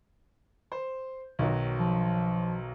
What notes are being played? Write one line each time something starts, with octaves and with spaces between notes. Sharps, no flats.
C5
B1 D#3 F#3
F3